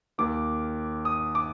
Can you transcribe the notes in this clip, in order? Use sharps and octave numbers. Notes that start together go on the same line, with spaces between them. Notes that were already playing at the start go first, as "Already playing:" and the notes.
D#2 D#3 A#3 D6
D#6
D6